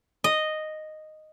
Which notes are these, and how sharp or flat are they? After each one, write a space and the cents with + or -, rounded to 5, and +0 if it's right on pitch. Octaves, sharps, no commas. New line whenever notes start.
D#5 -5